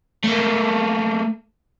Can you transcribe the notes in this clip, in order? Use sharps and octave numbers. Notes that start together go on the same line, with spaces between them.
A3 A#3